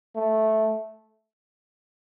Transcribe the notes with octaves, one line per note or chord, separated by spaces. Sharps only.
A3